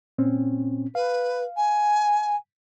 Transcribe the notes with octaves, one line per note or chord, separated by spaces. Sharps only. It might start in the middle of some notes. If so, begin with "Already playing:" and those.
A#2 C4 C#4
B4 F5
G#5